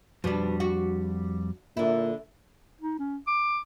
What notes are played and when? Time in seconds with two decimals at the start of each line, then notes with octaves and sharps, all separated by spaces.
0.24 F2 B2 G3 D4
0.60 F#4
1.77 A#2 D3 E4
2.81 D#4
2.99 C#4
3.27 D6